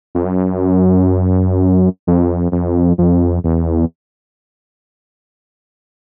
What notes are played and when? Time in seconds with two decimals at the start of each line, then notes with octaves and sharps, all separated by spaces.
0.15 F2
0.25 F#2
2.07 F2
2.52 F2
2.98 F2
3.44 E2